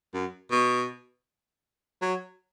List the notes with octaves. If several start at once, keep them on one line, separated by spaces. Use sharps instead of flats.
F#2
B2
F#3